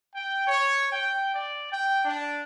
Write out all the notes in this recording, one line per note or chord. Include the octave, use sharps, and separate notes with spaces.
G5
C#5
G5
D5
G5
D4